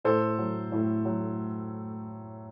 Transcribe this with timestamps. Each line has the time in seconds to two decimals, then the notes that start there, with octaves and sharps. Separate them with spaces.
0.04 A2 A4 C5
0.38 F#3
0.72 A2
1.05 F#3